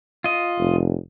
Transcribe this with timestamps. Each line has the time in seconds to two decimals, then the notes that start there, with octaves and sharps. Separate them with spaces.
0.24 F4 D#5
0.59 F1